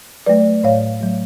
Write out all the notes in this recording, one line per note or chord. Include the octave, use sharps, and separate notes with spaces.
F#3 A3 B4 D5
A2 C#5 F5
F#3 A3